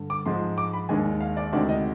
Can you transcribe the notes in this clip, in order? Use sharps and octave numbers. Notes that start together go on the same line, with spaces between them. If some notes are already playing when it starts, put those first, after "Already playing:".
Already playing: G2 D3
D6
G#2 F3 G#3 C6
D6
B5
D#2 D#3 G#3 D4 G#5
F5
D5
D2 C3 D#3 G#3 D4 D5
D#5